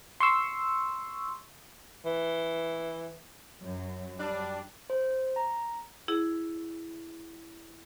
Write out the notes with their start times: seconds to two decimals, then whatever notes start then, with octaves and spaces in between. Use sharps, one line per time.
0.20 C6 C#6 E6
2.05 E3
3.61 F#2 F#3
4.18 G3 D4
4.90 C5
5.36 A#5
6.08 E4 G#4